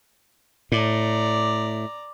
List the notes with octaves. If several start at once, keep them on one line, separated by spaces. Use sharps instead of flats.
A2 D5 A#5